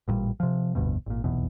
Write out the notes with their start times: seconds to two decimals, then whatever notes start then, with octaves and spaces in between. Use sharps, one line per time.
0.08 A1 G2 A#2 G3
0.40 C3 F3
0.75 F1 D2 G2 B2
1.06 G#1 A#2
1.24 F1 B1 E2 B2